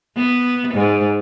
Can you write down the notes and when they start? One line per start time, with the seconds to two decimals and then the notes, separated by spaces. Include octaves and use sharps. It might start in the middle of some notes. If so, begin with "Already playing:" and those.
0.17 B3
0.74 G#2